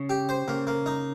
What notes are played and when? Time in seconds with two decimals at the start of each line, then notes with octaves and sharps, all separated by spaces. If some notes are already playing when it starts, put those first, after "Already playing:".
Already playing: C#3
0.10 G4
0.29 C5
0.48 C#3 A#3
0.67 A#3
0.86 D#4